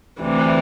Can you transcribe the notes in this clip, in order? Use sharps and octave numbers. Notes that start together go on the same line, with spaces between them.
D2 C3 E3 G3